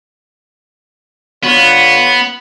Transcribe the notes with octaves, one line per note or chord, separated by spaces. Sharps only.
D3 B3 F4 C#5